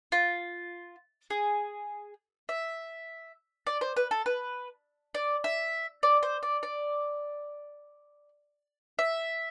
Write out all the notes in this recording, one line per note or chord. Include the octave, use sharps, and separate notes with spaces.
F4
G#4
E5
D5
C5
B4
A4
B4
D5
E5
D5
C5
D5
D5
E5